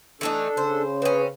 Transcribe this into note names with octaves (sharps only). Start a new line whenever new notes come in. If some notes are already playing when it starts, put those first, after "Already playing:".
E3 A3 D4 D#4 A4
C#3 C5
C4 C#4 G#4 B4